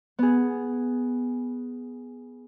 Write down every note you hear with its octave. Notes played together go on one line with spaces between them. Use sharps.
B3 G#4